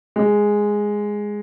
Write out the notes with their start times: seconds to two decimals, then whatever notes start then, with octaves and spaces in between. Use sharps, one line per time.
0.16 G#3